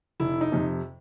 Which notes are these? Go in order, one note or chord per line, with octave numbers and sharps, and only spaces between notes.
F1 E4
D#4
F2 C3